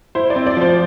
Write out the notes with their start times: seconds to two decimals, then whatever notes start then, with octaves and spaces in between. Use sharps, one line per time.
0.15 E4 C5
0.30 D5
0.36 C4
0.46 D5
0.57 F3 C5